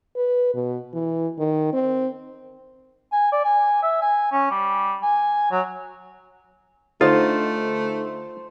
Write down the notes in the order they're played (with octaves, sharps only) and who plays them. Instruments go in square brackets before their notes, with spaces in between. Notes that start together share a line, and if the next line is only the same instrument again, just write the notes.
[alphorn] B4
B2
E3
D#3
C4
[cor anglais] G#5
D5
G#5
E5
G#5
C#4
G3
G#5
F#3
[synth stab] D3 D#4 A6 [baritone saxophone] A3 [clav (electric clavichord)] F4 [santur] C5